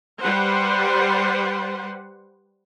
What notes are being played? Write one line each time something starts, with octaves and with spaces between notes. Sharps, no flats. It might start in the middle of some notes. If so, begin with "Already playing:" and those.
G3 B4 C5 F#5